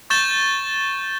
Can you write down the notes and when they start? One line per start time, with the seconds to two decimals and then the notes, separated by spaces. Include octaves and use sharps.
0.10 C#6 G6 A6 E7 G7